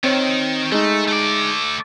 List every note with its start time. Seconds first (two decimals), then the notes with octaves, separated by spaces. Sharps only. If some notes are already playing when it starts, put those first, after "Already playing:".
0.04 D#3 C4 C#5
0.72 G#3 A3 D#4
1.08 A3 D5